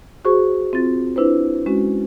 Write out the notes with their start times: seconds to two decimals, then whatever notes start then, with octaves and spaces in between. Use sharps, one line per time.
0.25 F#4 G#4 C5 C#6
0.73 C4 F4 A6
1.16 D4 E4 B4 C5
1.66 G#3 C#4 F#4